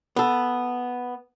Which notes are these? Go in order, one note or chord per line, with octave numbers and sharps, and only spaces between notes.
B3 A4